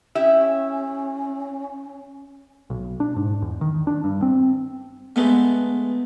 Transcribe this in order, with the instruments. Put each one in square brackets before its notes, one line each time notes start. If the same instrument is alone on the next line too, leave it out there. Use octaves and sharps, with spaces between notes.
[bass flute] C#4 [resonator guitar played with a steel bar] E4 G4 E5
[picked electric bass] B1
D4
G#2
E2
D#3
D4
G2
C4
[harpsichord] G2 G#3 A3 [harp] B3